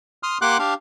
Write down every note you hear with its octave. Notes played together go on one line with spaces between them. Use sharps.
C6 D#6 F6
A#3 G4 F#5 C6 D6 F#6
D4 G4 F5